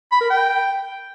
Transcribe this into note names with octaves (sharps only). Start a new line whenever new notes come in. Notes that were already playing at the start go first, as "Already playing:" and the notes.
B5
A#4
G5